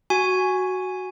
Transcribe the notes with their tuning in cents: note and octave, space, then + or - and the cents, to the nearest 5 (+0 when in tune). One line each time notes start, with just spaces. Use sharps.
F#4 +0 G#5 +0